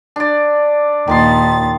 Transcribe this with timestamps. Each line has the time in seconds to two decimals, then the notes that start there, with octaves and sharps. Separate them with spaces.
0.16 D4 D5
1.08 D#2 A#2 D#3 F3 C6 A6